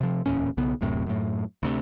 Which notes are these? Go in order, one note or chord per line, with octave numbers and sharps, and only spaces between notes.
C3 F3
D1 E2 A#2 C#4
B1 C#3 B3
D1 F#2 A2 C3
F#2 A2
D2 C3